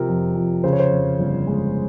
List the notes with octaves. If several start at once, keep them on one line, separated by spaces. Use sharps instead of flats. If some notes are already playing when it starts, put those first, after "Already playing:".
Already playing: C3 F3 A#4
F2
F2
C#3 C5
C#5
C5
F2
G1
G#3